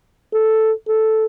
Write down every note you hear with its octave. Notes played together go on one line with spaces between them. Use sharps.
A4
A4